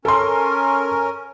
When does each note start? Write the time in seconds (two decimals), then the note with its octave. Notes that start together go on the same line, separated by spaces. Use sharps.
0.05 C#4 A4 A#4 C6